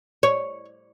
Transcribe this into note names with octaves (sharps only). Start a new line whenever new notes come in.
C#5